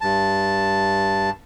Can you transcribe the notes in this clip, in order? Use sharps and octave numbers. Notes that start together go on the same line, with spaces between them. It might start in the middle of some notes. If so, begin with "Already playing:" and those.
G2 A5